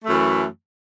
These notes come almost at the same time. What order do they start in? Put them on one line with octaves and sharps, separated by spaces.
A3 F#2 E3